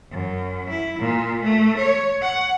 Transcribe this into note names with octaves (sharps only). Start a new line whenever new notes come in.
F#2
E4
A#2
A3
C#5
F#5